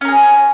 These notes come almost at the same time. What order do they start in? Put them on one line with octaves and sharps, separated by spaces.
C#4 A#4 G#4